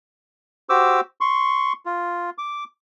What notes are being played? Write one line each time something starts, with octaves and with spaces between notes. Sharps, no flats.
F#4 G4 C5 D6 E6
C6 C#6
F4
D6